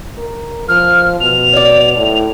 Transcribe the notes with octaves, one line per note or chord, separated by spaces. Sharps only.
A#4
F3 F6
B2 F7
C#5 D5
A2